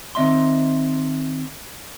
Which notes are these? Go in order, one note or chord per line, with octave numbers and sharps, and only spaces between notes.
D#3 C4 D#5 E5 C6